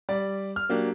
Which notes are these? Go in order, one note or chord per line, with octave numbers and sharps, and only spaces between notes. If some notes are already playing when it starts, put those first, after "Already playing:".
G3 D5
F6
F#3 A#3 D4 G4